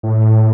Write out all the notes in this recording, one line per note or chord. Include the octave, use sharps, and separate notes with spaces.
A2